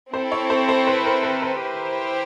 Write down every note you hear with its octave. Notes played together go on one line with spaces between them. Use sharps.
C4 E4 A4 C5
C#5
C5
C5
B4
A#4
B4
B4
E4 G4 C5